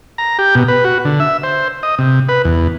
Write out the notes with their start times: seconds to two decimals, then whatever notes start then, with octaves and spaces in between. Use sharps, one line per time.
0.18 A#5
0.39 G4
0.55 B2
0.68 B4
0.84 F#4
1.05 D3
1.20 E5
1.43 C5
1.83 D#5
1.98 C3
2.29 B4
2.45 E2